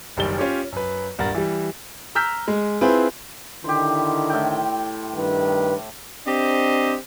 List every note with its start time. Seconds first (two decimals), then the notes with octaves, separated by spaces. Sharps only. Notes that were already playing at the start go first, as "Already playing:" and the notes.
0.17 F#1 F#2 D#3 G3 D5 G7
0.38 C#4 F4 G4 C#5
0.72 F#2 B4
1.18 D#1 G2 A#4 F#5 A#5 A6
1.35 E3 G3
2.15 A#5 E6 F6 G6 B6
2.48 G#3
2.81 C4 E4 F4 G#4 B4
3.64 D3 D#3 E4 G4 C5
4.29 A2 G5
5.14 G2 D#3 B4
6.27 C4 D4 G4 C5 D#5